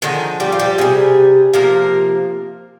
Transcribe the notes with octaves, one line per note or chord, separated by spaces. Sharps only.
D3 D#3 F3 G#3 D#4
G3 G4
F4
G3 G4
C3 G3 G#3 G#4
C3 F3 A#3 A#4